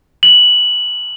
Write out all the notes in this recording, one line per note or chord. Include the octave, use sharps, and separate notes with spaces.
F#7